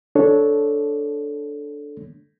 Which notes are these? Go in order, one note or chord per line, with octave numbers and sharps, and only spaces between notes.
D4 A4 C#5